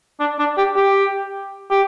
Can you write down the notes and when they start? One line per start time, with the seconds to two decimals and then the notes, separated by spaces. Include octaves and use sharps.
0.19 D4
0.39 D4
0.57 G4
0.76 G4
1.71 G4